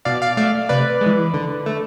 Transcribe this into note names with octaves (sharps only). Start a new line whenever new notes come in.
B2 D5 F5
D5 F5
A3 D5 F5
C3 B4 D5
G#3
E3
D3
A3